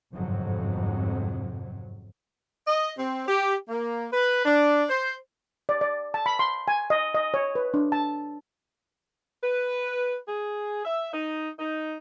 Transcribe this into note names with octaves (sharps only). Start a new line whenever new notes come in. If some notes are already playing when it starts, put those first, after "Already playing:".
G1 F2 G#2 C3 F#3
D#5
C4
G4
A#3
B4
D4
C5
D5
D5
A5
B5
C6
G#5
D#5
D#5
C#5
B4
D4
A5
B4
G#4
E5
D#4
D#4